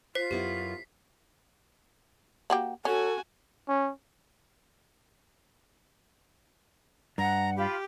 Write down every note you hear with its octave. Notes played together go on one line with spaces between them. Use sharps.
F4 C5 B6 C7
F#2 B3 E4 G4
A#3 F#4 G4
C#4 F#4 A4 G#5
C#4
G2 F#5 A#5
F4 G4 B5